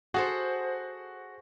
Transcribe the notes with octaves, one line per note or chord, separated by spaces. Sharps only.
F#4 G#4 A4 C5 F#5